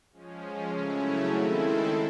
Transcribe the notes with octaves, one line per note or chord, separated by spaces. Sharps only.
F3 G#3 C#4
C#3 F#3 A3 C#4 E4
D#3 G#3 C4 E4 A4